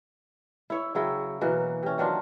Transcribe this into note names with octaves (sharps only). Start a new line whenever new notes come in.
E4 C#5 E5
C#3 F#3 E4 G5
B2 E3 F#3 A#3
C3 C#4
D#3 F#3 D4 F4